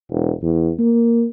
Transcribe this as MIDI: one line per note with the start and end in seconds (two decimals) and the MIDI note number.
0.10 0.31 28
0.43 0.71 40
0.79 1.28 58